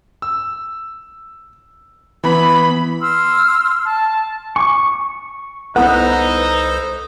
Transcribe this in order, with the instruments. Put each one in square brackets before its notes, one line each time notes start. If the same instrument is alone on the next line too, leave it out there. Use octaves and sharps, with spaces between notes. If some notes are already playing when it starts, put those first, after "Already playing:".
[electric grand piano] E6
[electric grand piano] E3 B3 [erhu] B5
[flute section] C6 E6 F6
A5
[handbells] G#5 D6 [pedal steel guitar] C#6
[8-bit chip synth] C2 A4 C5 [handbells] B3 E4 F#5 [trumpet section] D#4 [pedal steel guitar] B4